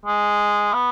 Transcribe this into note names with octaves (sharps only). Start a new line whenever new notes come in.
G#3
B3